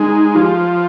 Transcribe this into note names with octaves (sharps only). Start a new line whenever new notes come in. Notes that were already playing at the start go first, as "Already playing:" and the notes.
Already playing: G#3 D#4
F3 G4